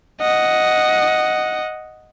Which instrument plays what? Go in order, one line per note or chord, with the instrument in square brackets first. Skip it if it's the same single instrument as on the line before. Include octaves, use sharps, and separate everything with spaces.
[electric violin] D#5 F#5